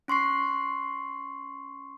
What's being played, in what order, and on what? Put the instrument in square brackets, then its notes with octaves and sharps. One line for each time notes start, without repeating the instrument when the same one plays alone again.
[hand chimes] C#4 C6 C#6 C7